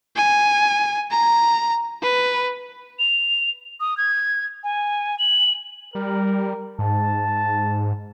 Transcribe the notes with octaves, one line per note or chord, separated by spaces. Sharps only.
G#5
A#5
B4
F7
D#6
G#6
G#5
F#7
G3 A#4
G#2 A5